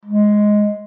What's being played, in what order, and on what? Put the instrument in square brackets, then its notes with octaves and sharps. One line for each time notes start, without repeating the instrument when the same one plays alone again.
[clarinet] G#3